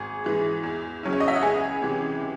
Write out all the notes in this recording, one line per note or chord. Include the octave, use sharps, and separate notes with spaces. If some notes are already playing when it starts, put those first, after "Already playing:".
Already playing: G#1 G#4 G#5
G#2 E3 G#3
E2
C#3 F#3 C#4 E4
C#5
D#5
E5
F#5
C#2 G#4 G#5
C3 E3 G#3